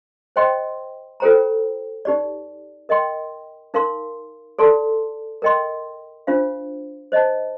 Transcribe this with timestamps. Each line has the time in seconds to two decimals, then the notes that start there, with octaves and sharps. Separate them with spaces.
0.36 C5 D#5 G5 C6
1.20 F4 A4 C5 G5 A#5
2.05 D#4 G4 D5
2.89 A#4 D#5 G5 C6
3.74 D#4 A#4 F5 C6
4.59 A4 D5 A5 C6
5.42 A#4 D#5 G5 C6
6.27 D4 F4 C5 F5
7.12 C5 D#5 A5